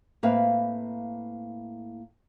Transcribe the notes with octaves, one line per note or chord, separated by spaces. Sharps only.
A2 A#3 C4 B4 E5 F5